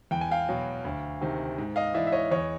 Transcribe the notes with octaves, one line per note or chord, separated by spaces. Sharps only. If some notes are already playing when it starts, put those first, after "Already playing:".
E2 G5
G#5
F5 G5
B2 F#3
D2
C3 D#3
G#2
D#5 F5
E3 D5 E5
E5
C#5 D#5
E2 C#5 D#5